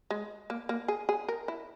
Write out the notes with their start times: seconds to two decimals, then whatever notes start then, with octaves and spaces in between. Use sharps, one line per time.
0.10 G#3
0.50 A#3
0.69 A#3
0.88 G#4
1.09 G#4
1.28 A#4
1.48 E4